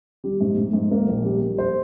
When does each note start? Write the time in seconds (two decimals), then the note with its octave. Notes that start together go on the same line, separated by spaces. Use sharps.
0.24 G3
0.41 G#2
0.57 G#2
0.73 G#2
0.91 A#3 A#4
1.08 A#1
1.25 G3
1.41 G3
1.58 C5